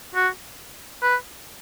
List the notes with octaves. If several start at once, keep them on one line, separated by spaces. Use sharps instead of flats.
F#4
B4